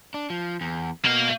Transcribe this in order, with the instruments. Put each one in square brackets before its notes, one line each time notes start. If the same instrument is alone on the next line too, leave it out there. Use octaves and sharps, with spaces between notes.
[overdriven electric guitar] D4
F3
E2
[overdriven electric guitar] B2 [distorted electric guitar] A#3 F5